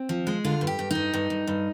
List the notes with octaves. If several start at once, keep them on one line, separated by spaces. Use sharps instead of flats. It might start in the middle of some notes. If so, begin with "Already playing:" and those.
Already playing: C4
F3
G#3
D3 F4
G2
G4
G2
G2 D#4
G2
G2
G2